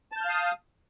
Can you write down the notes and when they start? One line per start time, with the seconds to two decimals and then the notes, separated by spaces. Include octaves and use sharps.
0.12 A5
0.16 G6
0.21 F6
0.25 F5
0.30 D#6